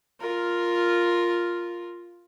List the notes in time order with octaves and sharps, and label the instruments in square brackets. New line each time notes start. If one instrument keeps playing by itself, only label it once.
[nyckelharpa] F4 A#4